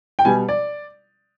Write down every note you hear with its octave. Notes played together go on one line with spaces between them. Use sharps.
G5
B2 G3 G#5
D5